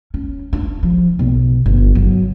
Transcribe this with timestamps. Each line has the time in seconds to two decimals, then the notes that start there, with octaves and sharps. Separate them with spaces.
0.14 C#4
0.53 D4
0.83 F3
1.19 B1
1.66 G1
1.95 F#3